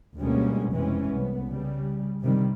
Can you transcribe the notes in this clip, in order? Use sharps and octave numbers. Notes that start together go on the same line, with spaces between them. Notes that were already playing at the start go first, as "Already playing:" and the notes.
D2 B2 G3 G#3 A#3 C#4
F1 E3 G#3 C4 C#4
C2 B3
C#3 G3
G2 C3 D#3 G3